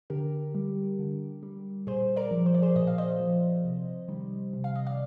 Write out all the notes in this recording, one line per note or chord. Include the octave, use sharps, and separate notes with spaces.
D3 G4 A#4
G3
D3
G3
A#2 G#4 C5
A#4 D5
F3
C5
D5
G#4 C5
A#2 D#5
F5
C5 D#5
F3
C3
D#3 G3
C3
F5
D#5
D5 F5